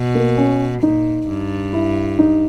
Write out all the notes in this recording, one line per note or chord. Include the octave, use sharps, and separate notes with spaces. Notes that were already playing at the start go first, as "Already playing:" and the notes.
Already playing: B2
A#3
C#4
A#2 D#4
G2
E4
D#4